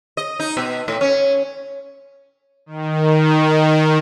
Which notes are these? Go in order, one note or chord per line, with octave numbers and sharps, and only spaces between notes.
D#5
D#4
B2
A2
C#4
D#3